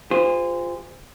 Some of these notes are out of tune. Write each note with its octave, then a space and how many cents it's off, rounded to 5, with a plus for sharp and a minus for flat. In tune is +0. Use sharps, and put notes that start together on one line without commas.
F4 +10 G#4 -35 C5 -25